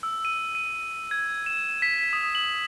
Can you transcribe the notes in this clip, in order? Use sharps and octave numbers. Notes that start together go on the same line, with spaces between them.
E6
D#7
D#7
G#6
E7
B6
D#6
F#7